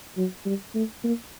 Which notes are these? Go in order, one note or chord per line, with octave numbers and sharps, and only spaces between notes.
F#3
G3
A3
A#3